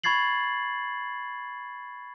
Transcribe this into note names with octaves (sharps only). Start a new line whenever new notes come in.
B5 C#6 G#6 A6 C7 F#7